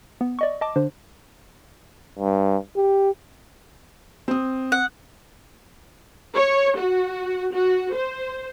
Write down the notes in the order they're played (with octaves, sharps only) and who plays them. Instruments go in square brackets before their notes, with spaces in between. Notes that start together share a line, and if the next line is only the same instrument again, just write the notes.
[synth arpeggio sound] B3
D5 D#5 C#6
D#5 A5 D6
D3 D4 C5
[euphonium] G2
G4
[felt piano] C4 D#6
[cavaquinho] F#5
[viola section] C#5
F#4
F#4
C5